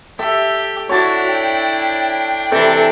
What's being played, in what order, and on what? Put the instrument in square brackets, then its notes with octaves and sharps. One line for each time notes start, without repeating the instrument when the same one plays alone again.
[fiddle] G4 [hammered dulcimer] A4 E5
[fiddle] D4 E4 [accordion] F#4 [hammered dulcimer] C#5 A5 D6
[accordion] G5
[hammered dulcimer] C3 E3 [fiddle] D4 [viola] A4